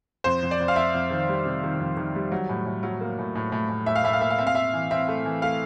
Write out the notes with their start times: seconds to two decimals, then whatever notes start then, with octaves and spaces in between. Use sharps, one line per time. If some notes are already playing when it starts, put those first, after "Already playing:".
0.24 F2 C5
0.43 F2
0.51 D5
0.60 F2
0.68 F5
0.76 F2 E5
0.94 F2
1.10 D#3
1.28 G3
1.45 C3
1.63 D#3
1.80 F2
1.97 D#3
2.15 G3
2.32 F#3
2.49 A2
2.66 A2
2.83 F#3
3.01 A#3
3.19 A2
3.35 A2
3.52 A2
3.69 A2
3.86 A2 E5
3.96 F5
4.04 A2 E5
4.13 F5
4.21 A#3 E5
4.30 F5
4.39 C4 E5
4.47 F5
4.55 C4 E5
4.73 E3
4.91 C4 E5
5.08 A3
5.25 E3
5.42 A3 F5